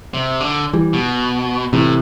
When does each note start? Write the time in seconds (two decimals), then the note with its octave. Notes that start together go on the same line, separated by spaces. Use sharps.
0.14 C3
0.40 D3
0.73 E3 G3
0.93 B2
1.73 A2 C3 E3